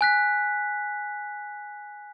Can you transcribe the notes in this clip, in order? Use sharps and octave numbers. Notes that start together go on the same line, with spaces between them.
G#5 F#6 B6